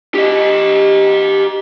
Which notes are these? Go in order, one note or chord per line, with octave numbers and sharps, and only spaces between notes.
G4 D#5